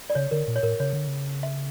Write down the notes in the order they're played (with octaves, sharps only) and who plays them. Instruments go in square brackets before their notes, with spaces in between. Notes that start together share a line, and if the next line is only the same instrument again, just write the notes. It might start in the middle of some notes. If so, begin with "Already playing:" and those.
[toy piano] D5
[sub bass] C#3 [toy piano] C#5
[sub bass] D3 [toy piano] A#4
[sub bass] A#2
[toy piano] C#5
[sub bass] A2 [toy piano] A#4
[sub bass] C#3 [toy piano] C#5
[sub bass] D3
C#3
[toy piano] E5